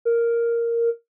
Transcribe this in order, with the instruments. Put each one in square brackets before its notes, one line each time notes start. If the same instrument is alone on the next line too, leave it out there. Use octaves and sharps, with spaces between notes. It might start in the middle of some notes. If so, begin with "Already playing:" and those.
[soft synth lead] A#4